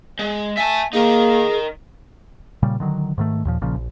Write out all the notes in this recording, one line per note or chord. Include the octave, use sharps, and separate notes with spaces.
G#3
E5 G#5 A5
A#3 D#4 G#4 A#4
A#2 C#3 G3
D3 D#3 F#3
G#2 D#3 A3
D#2 A#2 F3
A#1 A#2 C#3 F3
A#1